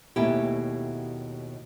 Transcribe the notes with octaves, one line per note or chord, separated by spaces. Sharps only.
D#2 B2 A3 C#4 E4 G4